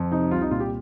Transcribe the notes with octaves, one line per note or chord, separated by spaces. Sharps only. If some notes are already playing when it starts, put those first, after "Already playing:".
Already playing: F2
C3 D#4
C2 F4
D#4
A#2 F4
G4